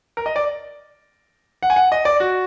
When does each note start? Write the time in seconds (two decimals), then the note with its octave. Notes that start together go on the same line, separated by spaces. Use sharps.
0.17 A#4
0.26 D#5
0.36 D5
1.63 F#5
1.70 G#5
1.76 F#5
1.92 D#5
2.05 D5
2.20 F#4